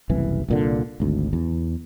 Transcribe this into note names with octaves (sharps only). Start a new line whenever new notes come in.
F#1 C2 E3
C2 A#2 D3
G#1 D2
E2